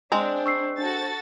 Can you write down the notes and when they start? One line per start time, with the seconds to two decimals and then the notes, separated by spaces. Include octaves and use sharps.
0.12 G#3 C4 D4 C5 G#5 A#5
0.46 C#6 E6 C7
0.78 D4 F#4 A4 A6